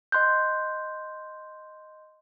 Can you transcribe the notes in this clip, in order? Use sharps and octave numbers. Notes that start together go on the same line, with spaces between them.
D#5 C6 F#6 G6